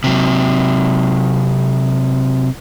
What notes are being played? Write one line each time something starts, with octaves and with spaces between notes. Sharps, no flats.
C3 F#3